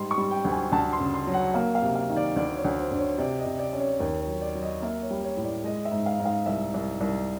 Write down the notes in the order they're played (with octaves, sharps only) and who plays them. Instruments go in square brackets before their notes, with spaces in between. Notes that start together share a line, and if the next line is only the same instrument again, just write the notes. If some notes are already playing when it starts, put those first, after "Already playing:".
Already playing: [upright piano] G#2 G3 C6
C#6
G3
G5
D2
G#5
D2 A5
C6
C#3
C6
F#3
F#5
A#3 F5
F5
C3
F5
D#3
D5
D2 D5
C#5
D2
C5
D3
C#5
C3 D5
D#5
C3
D5
C#4
C#5
D#2 C#5
C#5
F#3
D5
F#3
D#5
A#3 E5
C#5
G3
C#5
A2
D5
G#3 D#5
E5
G#2
F5
G#2
F5
C2 E5
C2
C2